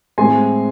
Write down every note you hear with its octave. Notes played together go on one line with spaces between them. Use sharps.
A2 G#3 C4 G#5 C6